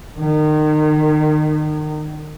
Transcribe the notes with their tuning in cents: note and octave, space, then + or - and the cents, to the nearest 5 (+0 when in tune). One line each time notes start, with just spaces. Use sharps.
D#3 -30